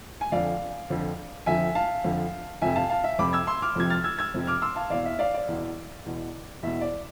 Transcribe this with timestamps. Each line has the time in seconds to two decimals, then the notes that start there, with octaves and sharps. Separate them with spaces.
0.21 G#5
0.32 F2 D3 F3 D5 F5
0.90 F2 D3 F3
1.46 F2 D3 F3 E5 G#5
1.75 F5 A5
2.04 F2 D3 F3
2.62 F2 C3 F3 E5 G#5
2.76 F5 A5
2.90 F5 A5
3.04 E5
3.19 F2 C3 F3 B5 D6
3.33 E6 G#6
3.47 C6 E6
3.62 D6 F6
3.76 F2 C3 F3 G#6
3.90 F6 A6
4.04 E6 G#6
4.19 E6 G#6
4.34 F2 C3 F3
4.47 D6 F6
4.62 C6 E6
4.76 F5 A5
4.90 E2 B2 D5 F5
5.05 E5
5.19 D5 F5
5.34 D5
5.48 E2 B2
6.06 E2 B2
6.63 E2 B2 E5
6.81 D5